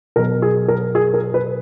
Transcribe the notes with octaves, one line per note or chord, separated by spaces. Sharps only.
B2 F#3 A#4
G#4
A#4
G#4
A#4
B4